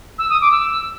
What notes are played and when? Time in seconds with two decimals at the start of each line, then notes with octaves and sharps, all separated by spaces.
0.18 E6
0.29 D#6
0.41 D6
0.51 E6